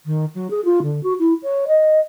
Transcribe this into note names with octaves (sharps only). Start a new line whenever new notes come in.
D#3
F#3
G#4
F4
D3
F#4
E4
C#5
D#5